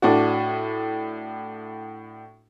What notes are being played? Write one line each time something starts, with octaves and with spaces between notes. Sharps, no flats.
A2 D4 F#4